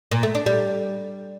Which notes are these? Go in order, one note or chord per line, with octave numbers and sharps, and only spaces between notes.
A#2
A3
D4
G3